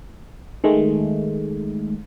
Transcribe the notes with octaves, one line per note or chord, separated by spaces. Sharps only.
D#3 G#3 A3